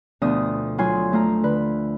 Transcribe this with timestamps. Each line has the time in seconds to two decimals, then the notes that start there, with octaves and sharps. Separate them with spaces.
0.22 D2 B2 F3 D4 D#6
0.78 F#3 F4 G#5 C6
1.12 F3 A3 F4 A#5
1.44 D3 B4